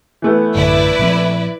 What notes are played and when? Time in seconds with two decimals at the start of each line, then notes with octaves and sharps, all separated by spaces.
0.22 E3 A3 B3
0.55 A1 F#2 D3 E4 B4 D5
0.99 A#2 F3 C4